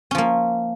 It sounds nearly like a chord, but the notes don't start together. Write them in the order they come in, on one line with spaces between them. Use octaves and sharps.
C#4 F3 A#3